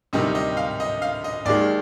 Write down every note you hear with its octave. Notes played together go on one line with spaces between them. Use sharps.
D2 C3 D#3 G3 D#5
D#5
F5
D#5
F5
D#5
D#2 D#3 G#3 D5